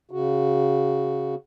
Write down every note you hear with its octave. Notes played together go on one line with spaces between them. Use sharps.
C#3 F#4